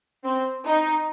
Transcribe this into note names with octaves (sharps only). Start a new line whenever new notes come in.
C4
D#4